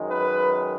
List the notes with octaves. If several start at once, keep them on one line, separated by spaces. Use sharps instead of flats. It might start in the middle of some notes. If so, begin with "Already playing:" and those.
Already playing: F#2 D#3 G#3
B4